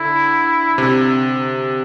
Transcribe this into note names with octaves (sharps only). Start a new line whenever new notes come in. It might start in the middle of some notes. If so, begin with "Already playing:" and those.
Already playing: D3 E4
C3